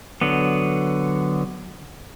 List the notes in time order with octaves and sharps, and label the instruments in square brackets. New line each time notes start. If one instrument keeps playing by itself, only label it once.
[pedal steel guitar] D3 F#3 B3